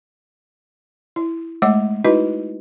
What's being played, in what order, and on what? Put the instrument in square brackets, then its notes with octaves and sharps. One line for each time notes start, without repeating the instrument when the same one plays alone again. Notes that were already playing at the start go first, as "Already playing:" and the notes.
[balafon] E4
G#3 A3 C#5 F#5 D6
D#4 E4 F#4 B4 D#5